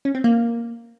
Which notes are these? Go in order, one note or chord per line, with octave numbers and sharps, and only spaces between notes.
C#4
C4
A#3